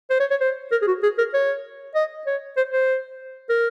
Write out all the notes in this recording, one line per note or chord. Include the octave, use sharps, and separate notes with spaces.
C5
C#5
C#5
C5
A#4
G#4
F#4
G#4
A#4
C#5
D#5
C#5
C5
C5
A#4